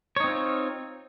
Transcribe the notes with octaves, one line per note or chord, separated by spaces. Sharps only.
C4 D#4 F4 C#5